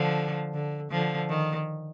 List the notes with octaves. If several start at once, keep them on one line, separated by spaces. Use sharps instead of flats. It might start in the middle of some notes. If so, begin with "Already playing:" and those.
Already playing: D3 F3
D3
D3 F3
D#3